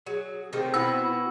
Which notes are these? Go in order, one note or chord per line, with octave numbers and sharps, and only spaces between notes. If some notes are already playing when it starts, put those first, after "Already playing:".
F#3 G#4
C3 D#3 A3 C4
B2 B3 E4 F#4 E6